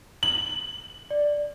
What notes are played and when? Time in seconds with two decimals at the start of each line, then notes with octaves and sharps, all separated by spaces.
0.23 F#7
1.10 D5